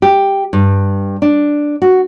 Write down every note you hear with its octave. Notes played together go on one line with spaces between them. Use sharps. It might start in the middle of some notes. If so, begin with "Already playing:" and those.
G4
G2
D4
F#4